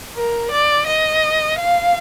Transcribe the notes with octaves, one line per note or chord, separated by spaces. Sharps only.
A#4
D5
D#5
F5